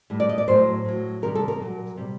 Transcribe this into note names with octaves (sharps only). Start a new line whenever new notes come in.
A2 G3
D5
D#5
D5
A2 F#3 C5
A2 F#3
C3 D#3 G3 A#4
A4
A#4
A#2 F#3
C3 G3